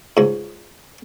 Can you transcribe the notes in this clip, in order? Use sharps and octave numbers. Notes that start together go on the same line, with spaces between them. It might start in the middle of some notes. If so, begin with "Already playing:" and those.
C#2 G#2